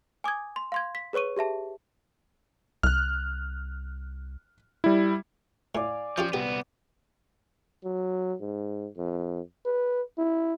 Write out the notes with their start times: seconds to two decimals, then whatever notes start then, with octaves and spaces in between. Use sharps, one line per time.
0.24 G#5 D6 D#6 G#6
0.56 C6
0.72 F5 C6 G#6
0.95 B6
1.13 G#4 B4 C#5 C#6 D#7
1.37 G4 G#4 E5 A5
2.83 C2 F6 F#6
4.84 G3 E4
5.75 A2 D5 F5 G#5
6.18 F3 C#4 F4 G4
6.33 C2 B3 G4
7.84 F#3
8.41 G#2
8.97 F2
9.65 B4
10.18 E4